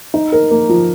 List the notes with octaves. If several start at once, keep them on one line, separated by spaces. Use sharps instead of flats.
D#4
A#4
A#3
F3